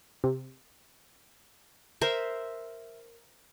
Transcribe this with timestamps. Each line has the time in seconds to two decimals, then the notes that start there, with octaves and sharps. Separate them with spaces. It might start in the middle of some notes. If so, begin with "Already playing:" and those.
0.24 C3
2.01 A#4 C5 E5